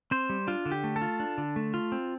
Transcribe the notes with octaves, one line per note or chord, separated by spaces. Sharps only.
C4 C5
G3
D4 F4
D3
G4
A3
A4
F4
D4
D3
A3
F4
C4